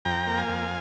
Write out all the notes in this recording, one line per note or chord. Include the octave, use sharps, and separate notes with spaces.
F2 G5 A#5
A#3
F5 G#5
F2